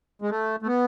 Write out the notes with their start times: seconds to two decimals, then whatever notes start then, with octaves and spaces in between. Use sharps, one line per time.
0.22 G#3
0.31 A3
0.62 A3
0.67 B3